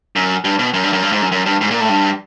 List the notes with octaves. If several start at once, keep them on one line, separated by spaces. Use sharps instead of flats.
F#2
G2
B2
F#2
G2
F#2
G2
G#2
F#2
F#2
G2
G#2
A#2
A2
G2